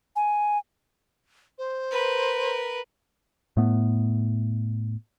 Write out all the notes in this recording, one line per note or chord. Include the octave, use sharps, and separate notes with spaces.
G#5
C5
A#4 B4
A2 A3 B3